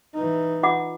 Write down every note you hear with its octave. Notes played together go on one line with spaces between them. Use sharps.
E3 D#4
F4 F#5 D6